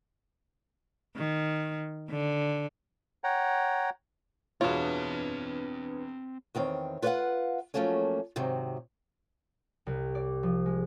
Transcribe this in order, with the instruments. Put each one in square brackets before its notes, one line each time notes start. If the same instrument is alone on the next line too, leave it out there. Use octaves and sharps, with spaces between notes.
[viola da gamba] D#3
D3
[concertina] C#5 F#5 G5 A#5
[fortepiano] E2 B2 C#5 [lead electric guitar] C4 A5 [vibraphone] D4 B4 [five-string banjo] F4
[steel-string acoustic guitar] E2 D#3 C4 C#5
F4 B4 C#5 D#5 F5 F#5
F3 F#3 A3 A#3 C#4
G#2 C3 D#3 F#3
[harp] C2
D5
F3
G#3